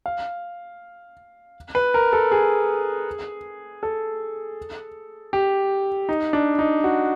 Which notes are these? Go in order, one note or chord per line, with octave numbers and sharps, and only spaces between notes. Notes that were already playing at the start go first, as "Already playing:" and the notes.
F5
B4
A#4
A4
G#4
A4
G4
D#4
D4
D#4
F#4